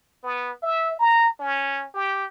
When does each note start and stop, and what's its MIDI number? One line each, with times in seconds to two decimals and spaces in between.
0.23 0.52 59
0.63 0.95 76
0.99 1.28 82
1.39 1.86 61
1.94 2.24 67